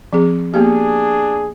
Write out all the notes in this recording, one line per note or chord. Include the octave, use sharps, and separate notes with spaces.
F3 C4 G#4
A#3 B3 D4 G4 G#4